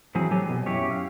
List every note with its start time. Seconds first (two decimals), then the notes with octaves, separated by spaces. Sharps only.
0.15 A2 E3 F#3 C4 G#4
0.31 F#3 G4 A4 G#5
0.49 B2
0.66 F#2 E4 G4 C#5
0.91 F5